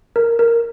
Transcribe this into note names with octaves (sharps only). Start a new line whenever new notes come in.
A#4
A#4